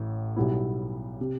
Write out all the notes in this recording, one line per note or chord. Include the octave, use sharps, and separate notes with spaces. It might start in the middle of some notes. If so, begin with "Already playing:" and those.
Already playing: A1 A2
B1 B2 G3 B3 E4
C3